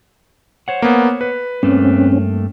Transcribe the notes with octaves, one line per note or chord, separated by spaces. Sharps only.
C5 C#5 F#5
A#3 B3
B4
G2 A3 A#3 C4 C#4